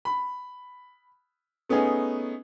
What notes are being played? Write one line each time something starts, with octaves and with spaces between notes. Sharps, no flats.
B5
A3 B3 C#4 D#4 G#4